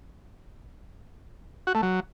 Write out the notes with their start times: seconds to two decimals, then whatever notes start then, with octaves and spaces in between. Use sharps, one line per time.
1.67 F#4
1.75 A3
1.83 F#3